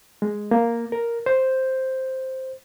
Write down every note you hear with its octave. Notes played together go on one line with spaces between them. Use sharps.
G#3
A#3
A#4
C5